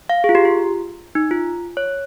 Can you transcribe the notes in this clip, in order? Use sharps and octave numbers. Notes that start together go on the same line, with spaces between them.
F5
G#4
F4
G4
F4
D#4
F4
C#5